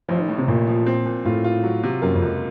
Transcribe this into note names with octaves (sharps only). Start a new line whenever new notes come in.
A1 F3
D#3
A2
C3
A1 A#2
F3
C4
A#2
A2 F4
F4
F#3
C3
F#2 A#3
F2
C#2